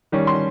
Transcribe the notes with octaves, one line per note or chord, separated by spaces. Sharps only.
D#3 G3 C#4
C6